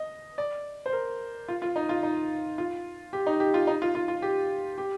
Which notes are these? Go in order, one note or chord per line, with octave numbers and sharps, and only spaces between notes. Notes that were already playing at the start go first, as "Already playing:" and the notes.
Already playing: D#5
D5
C5
A#4
F4
F4
D#4
F4
D#4
F4
G4
D#4
G4
F4
D#4
F4
F4
F4
G4
G4